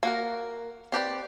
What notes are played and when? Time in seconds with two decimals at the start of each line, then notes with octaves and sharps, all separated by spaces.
0.03 A#3 F#4 A#4
0.92 C4 G4 B4 D5